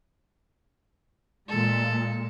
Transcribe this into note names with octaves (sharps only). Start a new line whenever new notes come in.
A#2 G#3 A4